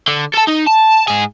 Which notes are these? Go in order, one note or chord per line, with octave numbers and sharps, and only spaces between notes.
D3
A4 A5
D#4
A5
G#2 G#4